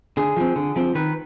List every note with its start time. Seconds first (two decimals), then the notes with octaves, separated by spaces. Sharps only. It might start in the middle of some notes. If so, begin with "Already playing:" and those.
0.17 D3 G#4
0.37 F3 C4
0.56 D3
0.76 F3 C4
0.95 D#3 B4